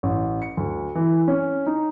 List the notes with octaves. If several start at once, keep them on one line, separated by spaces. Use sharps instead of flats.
A1
C#7
D2
E3
C#4
D#4